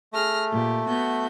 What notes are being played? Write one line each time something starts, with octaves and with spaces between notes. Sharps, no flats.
A3 G#4 F6 A#6
A#2 G4
B3 F#4 G6